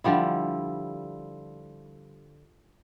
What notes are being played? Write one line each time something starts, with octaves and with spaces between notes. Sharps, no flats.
D3 F3 G3 E4